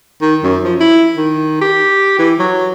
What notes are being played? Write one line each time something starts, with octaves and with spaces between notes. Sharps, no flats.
D#3
F#2
F3
E4
D#3
G4
E3
F#3